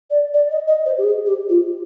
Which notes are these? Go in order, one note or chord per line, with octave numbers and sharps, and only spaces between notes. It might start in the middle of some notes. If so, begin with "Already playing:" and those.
D5
D5
D#5
D#5
C5
G4
G#4
G4
F4